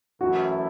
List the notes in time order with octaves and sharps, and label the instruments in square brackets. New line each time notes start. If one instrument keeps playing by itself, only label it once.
[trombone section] F#2 E3 A3 E4 [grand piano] F#4